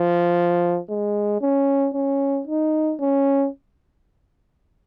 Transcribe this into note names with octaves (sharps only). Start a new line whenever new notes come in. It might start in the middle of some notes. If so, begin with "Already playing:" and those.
Already playing: F3
G#3
C#4
C#4
D#4
C#4